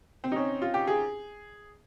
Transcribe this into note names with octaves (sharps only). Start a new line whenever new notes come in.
C4
D#4
C#4
F4
G4
G#4